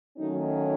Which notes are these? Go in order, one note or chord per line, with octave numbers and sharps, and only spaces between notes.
D#3 F#3 A3 C#4 D#4